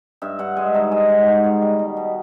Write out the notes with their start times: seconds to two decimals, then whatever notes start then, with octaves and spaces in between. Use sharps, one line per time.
0.22 G2 E5
0.39 G2 F#5
0.57 G#3 G#5
0.74 D#3 A5
0.91 G#2 G#5
1.09 G#2 F#5
1.27 G#3 F#5
1.44 D#3 F5
1.62 G3
1.79 B2
1.97 B2